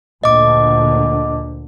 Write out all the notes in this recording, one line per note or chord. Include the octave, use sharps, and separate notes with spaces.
D2 A#2 D3 D#5 D6